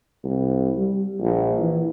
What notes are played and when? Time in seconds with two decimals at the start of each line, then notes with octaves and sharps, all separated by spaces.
0.24 C2
0.77 G3
1.20 A#1
1.60 E3